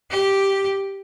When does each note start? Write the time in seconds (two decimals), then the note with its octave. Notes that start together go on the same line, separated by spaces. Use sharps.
0.11 G4